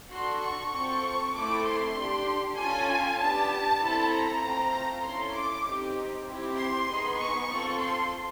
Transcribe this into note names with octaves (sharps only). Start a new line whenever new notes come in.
D4 F#4 A4 C6
C#6
C4 F4 A4 C#6
A3 C4 E4 A4 D6
C6
D4 G4
C#4 F4 A4 G#5
B3 D4 G4 A5
C4 E4 A4
A#5
A3 C4 F4
C#4 E4 A4 C6
D6
C4 D#4 G4
C4 E4 G4
C6
B3 D#4 G#4
C#6
C4 F4 A4
C6